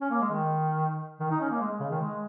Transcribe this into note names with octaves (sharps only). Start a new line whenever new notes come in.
C#4
A#3
G#3
D#3
D#3
D#4
C#4
A#3
G#3
C#3
D#3
G#3